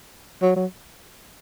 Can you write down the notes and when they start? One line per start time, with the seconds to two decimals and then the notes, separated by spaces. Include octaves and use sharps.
0.42 F#3
0.56 F#3